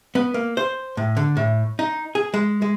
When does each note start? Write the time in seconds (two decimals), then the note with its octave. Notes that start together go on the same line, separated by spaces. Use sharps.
0.15 B3
0.34 A#3
0.57 C5
0.97 A2
1.17 D3
1.37 A2
1.79 D#4
2.15 G#4
2.34 G#3
2.62 G#3